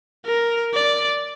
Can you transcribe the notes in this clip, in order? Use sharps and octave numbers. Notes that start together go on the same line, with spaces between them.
A#4
D5